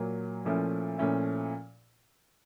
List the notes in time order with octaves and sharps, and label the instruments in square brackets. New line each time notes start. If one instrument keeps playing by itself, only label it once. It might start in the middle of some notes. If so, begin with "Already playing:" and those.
Already playing: [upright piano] A#2 F#3 A#3
A#2 F3 A3 C#4 E4
A#2 F3 A3 C#4 E4